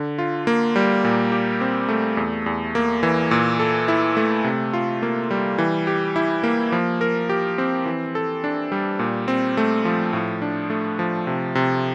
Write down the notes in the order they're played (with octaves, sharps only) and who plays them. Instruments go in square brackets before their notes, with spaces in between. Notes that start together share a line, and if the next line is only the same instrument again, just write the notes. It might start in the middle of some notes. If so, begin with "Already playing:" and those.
Already playing: [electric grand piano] D3
F4
A#3
G3
A#2
G4
C4
A3
E2
E2
A#3
E3
A#2
A4
E4
A3
C3
F4
A#3
G3
E3
G4
E4
A#3
F3
A#4
G4
C4
E3
A4
D4
G3
A#2
C4
A3
F3
A2
D4
A3
F3
C3
C3